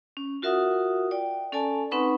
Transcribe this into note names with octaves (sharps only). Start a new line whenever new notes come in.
C#4
F4 F#4 A#4 E5 F#5 D#6
D5 G5
C#4 A4 D5 G#5 A5
C4 D#4 B4 F#5 B5 C#6